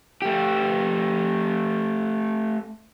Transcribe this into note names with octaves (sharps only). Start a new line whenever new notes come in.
A3 G4